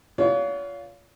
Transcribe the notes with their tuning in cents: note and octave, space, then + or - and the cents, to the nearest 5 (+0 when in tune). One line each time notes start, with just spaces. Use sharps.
B3 +0 F4 +0 C#5 +40